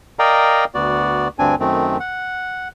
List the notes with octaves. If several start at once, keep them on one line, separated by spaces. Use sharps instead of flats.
A#4 D5 D#5 F5 G5 A#5
D2 B3 F#4 D5
D2 G2 C4 D4 G#5
F#2 D#3 A3 C4
F#5